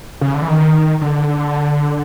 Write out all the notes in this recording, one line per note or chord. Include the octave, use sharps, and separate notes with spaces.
C#3
D3
E3
D#3
D3